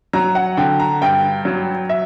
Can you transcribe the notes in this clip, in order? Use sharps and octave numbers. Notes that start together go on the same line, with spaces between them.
F#3 A#5
F#5
D3 G5
A#5
G2 G5
F#3
E5